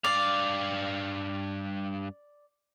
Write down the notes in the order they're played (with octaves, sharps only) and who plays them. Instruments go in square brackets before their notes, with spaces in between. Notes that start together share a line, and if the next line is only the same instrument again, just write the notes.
[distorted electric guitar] G2 F5 [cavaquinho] D5